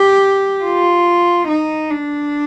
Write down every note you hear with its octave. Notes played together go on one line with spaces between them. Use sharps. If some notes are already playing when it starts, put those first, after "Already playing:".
Already playing: G4
F4
D#4
D4